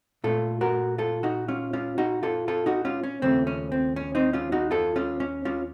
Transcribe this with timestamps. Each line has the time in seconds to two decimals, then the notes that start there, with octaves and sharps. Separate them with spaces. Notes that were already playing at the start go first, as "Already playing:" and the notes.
0.24 A#2 A3 F4 A4
0.61 F#4 A#4
0.98 F4 A4
1.23 D#4 F#4
1.48 C#4 F4
1.73 C#4 F4
1.98 D#4 F#4
2.23 F4 A4
2.48 F4 A4
2.66 D#4 F#4
2.85 C#4 F4
3.04 C#4
3.22 D#2 C#3 F3 A3 C4
3.47 C#4
3.72 C4
3.96 C#4
4.15 C4 D#4
4.33 C#4 F4
4.52 D#4 F#4
4.71 F4 A4
4.96 C#4 F4
5.20 C#4
5.45 C#4 F4